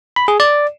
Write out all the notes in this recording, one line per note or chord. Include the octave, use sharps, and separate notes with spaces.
B5
G#4
D5